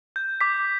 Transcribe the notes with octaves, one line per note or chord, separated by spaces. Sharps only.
G6
D6 B6